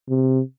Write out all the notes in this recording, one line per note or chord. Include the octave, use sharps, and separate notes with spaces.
C3